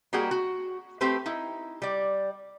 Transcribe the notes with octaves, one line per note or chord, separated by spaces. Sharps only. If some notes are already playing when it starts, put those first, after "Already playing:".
G3 A#3 F#4 G#4 G5
F#4
A3 C4 G4 B4 C5
D#4 E4
G3 D5